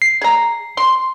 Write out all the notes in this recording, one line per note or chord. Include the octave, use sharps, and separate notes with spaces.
C7
G#4 A#5
C6